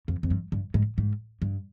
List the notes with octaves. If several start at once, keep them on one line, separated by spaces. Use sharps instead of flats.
F2
F2
G2
G2
G#2
G#2
G2